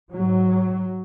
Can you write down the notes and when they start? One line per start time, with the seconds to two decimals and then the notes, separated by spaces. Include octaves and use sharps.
0.14 G#2 F#3